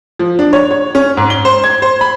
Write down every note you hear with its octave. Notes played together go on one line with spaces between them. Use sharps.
F3
D4
C#5
C#5
C#4
G#2
G7
C5
G#6
C5
B5